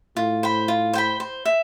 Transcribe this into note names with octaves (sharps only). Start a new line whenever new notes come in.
A2 F4
C5 G5 B5
F4
C5 G5 B5
C5
E5